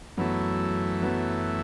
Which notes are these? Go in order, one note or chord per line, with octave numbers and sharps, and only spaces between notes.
F#2 E3 F#3 A3 B3
F#3 B3